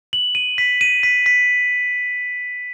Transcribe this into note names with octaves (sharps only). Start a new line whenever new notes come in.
F#7
D#7
B6
D#7
B6
B6